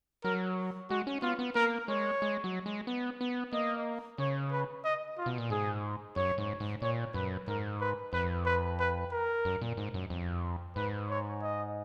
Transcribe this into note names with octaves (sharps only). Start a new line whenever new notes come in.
F#3 A#4
G#3 F#4
C#4
B3 F4
B3
A#3 A#4
G#3 C#5
G#3
F#3
G#3
B3
B3
A#3 D#5
C#3 C#5
B4
D#5
F4
B2
A#2
G#2 G#4
F#2 C#5
G#2
G#2
A#2 C#5
F#2 B4
G#2 A#4
B4
F2 B4
B4
B4
A#4
F#2
A#2
G#2
F#2
F2
G#2 B4
C#5
D#5